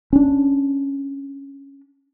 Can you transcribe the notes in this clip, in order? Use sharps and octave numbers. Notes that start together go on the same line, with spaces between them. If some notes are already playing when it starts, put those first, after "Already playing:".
C#4 D4